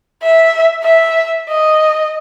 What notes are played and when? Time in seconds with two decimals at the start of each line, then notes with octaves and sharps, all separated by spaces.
0.23 E5
0.83 E5
1.49 D#5